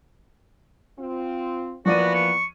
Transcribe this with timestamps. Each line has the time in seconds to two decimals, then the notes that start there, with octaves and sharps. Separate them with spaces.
0.99 C4 F4
1.86 E3 F3 A#3 B3 F#4 D5 D#7
2.15 C#6